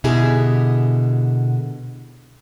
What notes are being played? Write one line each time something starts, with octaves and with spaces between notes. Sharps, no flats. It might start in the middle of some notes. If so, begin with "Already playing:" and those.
B2 D3 E4 G4 G#4